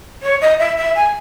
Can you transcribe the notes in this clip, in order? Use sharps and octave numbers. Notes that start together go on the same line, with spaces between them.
C#5
D#5
E5
E5
G#5